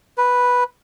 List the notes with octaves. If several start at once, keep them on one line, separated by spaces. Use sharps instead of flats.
B4